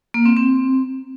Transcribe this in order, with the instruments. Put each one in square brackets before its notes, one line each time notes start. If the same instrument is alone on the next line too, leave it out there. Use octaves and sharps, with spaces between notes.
[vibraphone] A#3
C4
C4